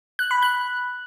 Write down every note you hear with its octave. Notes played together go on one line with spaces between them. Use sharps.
F#6
B5
F#6